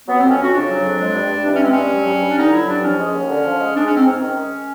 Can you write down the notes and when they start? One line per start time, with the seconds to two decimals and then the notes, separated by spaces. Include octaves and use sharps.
0.08 F#3 B3
0.19 F2 C4
0.30 C#4
0.38 F2 F#4
0.53 C#3 D4
0.69 F#3
0.84 F2
1.00 G#3
1.15 G2
1.30 G2
1.45 E3 D4
1.54 C#4
1.61 G#3 C4
1.72 G2 C#4
1.92 F#3
2.07 G2
2.22 G2
2.30 D4
2.37 D3 D#4
2.53 F#3 E4
2.68 G2 D4
2.83 F3 C#4
2.99 G#3
3.14 D#2
3.29 D3
3.45 F3
3.61 G#3
3.76 G#3 D4
3.86 G#2 C#4
3.96 C4
4.06 G#2 C#4
4.22 D#3
4.37 G#3